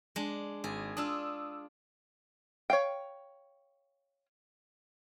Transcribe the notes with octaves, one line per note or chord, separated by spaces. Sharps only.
G#3 D4
G#1 G#4
D4 F4 D#6 E6
C#5 F5 G5